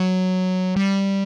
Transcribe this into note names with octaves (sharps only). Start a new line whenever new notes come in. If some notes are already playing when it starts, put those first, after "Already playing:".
Already playing: F#3
G3